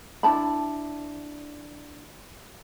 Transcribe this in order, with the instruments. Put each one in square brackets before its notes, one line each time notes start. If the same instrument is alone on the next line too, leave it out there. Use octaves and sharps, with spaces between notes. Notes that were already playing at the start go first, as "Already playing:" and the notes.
[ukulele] D4 E4 A5 B5